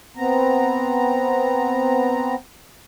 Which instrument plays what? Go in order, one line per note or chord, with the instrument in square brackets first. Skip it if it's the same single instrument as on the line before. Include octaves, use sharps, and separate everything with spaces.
[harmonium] B3 C4 A#5